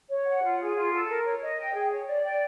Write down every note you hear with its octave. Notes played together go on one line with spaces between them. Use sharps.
C#5
F#5
F4
G#4
F4
A4
A#4
C#5
D#5
G5
G#4
C#5
D5
G5